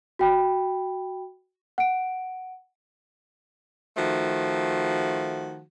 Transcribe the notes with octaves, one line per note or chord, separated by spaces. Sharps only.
F#4 G5 B5
F#5 D7
D#3 F3 A3 F#4